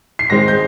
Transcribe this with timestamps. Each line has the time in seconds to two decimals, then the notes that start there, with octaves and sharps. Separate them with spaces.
0.19 C7
0.30 G#2 D#3 G#3 C4 A#6
0.48 G6